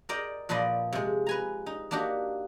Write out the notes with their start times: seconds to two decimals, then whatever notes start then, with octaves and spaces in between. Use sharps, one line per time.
0.09 A#4 D5 D#5 G5
0.49 A#2 F3 B4 D5 D#5
0.93 C3 G#3
1.26 B4 G#5 A#5
1.66 D#4
1.91 A#3 D4 D#4 F#4 G4